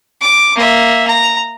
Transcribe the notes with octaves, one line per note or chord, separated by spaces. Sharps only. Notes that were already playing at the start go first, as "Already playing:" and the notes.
D6
A#3 E5
A#5